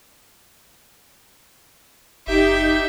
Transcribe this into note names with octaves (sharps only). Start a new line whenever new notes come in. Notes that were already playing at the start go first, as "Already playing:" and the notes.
F#1 D#4 G4 E5 G5